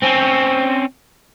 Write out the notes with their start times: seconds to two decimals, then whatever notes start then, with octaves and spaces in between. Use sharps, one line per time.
0.03 C4 C#4